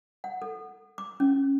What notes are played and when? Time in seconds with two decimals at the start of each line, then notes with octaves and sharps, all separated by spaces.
0.24 F#5
0.42 A4
0.98 D6
1.20 C#4